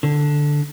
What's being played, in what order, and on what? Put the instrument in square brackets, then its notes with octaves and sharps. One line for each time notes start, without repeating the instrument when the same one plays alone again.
[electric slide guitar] D3